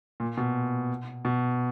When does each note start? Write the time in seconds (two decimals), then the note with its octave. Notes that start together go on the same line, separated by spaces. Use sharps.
0.20 A#2
0.37 B2
1.25 B2